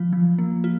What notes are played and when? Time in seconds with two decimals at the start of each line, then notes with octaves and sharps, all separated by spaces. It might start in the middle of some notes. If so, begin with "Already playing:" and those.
Already playing: F3 F4
0.13 F3
0.39 A#3
0.64 F4